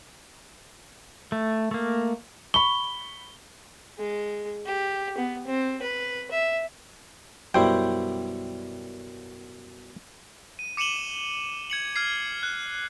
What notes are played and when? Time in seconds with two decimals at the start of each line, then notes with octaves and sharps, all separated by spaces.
1.32 A3
1.71 A3 A#3
2.54 B5 C#6 G7
3.98 G#3
4.66 G4
5.18 B3
5.47 C4
5.82 B4
6.31 E5
7.54 F#2 B2 G3 E4 C5 G5
10.59 D#7
10.77 D6 C#7 D#7 E7 F#7 G7
11.70 G#6 C#7 F#7
11.96 F6 G#6 C7
12.43 F#6